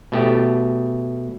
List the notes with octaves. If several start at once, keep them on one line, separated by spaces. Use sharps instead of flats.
B2 A3 G4